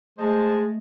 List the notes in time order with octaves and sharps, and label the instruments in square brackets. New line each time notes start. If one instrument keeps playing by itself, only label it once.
[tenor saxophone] G#3 [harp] A3 D#5 [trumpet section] C5 A5